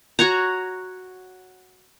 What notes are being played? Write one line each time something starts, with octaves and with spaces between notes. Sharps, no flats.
F#4 C#5 F#5 A#5